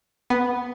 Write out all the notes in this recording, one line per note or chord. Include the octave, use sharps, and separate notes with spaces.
B3